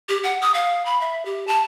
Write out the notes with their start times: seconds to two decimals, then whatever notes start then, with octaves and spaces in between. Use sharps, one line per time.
0.09 G4
0.24 F#5
0.42 D#6
0.54 F5
0.86 B5
1.01 E5
1.25 G4
1.47 A5